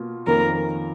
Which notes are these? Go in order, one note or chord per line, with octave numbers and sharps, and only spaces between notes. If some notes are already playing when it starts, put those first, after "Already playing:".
Already playing: B2 A#3 F4
F2 D#3 A#3 C#4 A#4